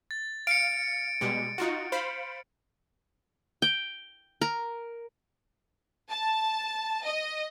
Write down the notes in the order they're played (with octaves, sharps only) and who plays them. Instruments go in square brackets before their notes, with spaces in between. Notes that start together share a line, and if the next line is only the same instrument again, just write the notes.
[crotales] A6
[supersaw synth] F5 [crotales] C#7 D7
[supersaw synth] B2 G3 G#3
D#4 F4 F#4
C5 F5 B5
[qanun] G5
A#4
[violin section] A5
D#5